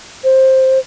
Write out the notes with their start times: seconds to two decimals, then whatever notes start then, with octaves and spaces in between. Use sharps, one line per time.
0.24 C5